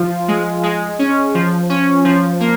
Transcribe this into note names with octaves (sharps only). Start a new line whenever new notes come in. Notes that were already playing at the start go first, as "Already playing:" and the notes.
Already playing: F3 F4
G#3
G#3
C#4
F3
C#4
F3
A#3